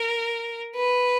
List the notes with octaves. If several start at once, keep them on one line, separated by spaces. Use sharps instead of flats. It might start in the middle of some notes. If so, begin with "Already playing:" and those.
Already playing: A#4
B4